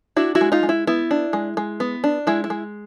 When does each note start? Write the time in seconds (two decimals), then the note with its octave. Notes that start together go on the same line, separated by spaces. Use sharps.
0.16 D4 E4 F#4
0.35 E4 F#4
0.41 G#3
0.52 D#4 F4
0.63 G#3
0.69 E4
0.87 B3 E4
1.11 D4
1.33 G#3
1.57 G#3
1.80 B3
2.04 D4
2.27 G#3 E4
2.44 E4
2.50 G#3